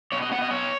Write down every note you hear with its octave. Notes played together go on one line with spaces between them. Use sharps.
B2 C#5
D#5
B3 F#5
D#5
B2 C#5